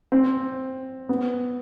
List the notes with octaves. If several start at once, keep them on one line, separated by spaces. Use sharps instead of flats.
C4
B3